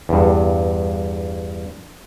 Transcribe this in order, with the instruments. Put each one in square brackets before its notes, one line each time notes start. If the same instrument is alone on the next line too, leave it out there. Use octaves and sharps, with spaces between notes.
[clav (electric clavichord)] E2 G2